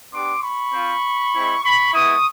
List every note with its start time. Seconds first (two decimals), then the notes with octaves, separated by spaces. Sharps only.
0.12 B3 D4 G4 C6 D6
0.43 B5 C#6
0.73 C4 F4
1.34 G#3 C4 E4
1.63 B5 C#6
1.93 G#3 B3 E4 C#6 D#6